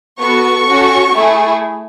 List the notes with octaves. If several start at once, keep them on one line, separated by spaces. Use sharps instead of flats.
B3 F#4 A4 C#6
C#4 F#4 A4
A3 E4 G#4